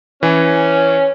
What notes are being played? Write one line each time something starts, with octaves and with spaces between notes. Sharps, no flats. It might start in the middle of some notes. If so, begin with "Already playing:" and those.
E3 C#4